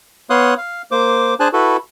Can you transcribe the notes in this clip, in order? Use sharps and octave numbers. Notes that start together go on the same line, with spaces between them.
B3 C#5 F5 C6 D#6 F#6
F5
A#3 C5 D6
D4 G#4 C5 G#5 A5 F#6
E4 F#4 A4 B4